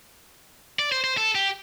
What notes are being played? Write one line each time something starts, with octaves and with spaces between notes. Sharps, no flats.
D5
C5
C5
A4
G4